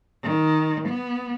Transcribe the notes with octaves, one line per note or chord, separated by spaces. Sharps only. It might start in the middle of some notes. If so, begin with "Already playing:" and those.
D#3
B3